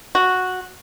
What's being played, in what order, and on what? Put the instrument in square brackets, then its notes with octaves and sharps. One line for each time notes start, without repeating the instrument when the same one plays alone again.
[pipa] F#4